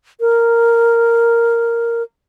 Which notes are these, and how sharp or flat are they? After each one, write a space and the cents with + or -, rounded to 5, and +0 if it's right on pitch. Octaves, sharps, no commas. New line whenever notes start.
A#4 -5